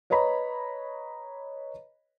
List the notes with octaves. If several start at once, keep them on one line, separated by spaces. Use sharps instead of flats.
B4 C#5 D#5 A#5 B5